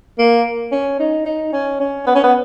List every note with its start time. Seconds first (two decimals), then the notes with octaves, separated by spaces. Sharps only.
0.18 A#3
0.71 C#4
0.99 D#4
1.25 D#4
1.52 C#4
1.80 C#4
2.06 B3
2.15 C#4
2.23 B3